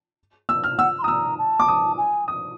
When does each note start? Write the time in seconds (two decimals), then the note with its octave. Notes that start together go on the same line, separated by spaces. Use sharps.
0.49 E6
0.64 F6
0.78 F#5 E6
0.99 C6
1.02 A#5 D#6
1.08 E6
1.38 A5
1.60 D6
1.68 D#6
1.98 G#5
2.28 D#6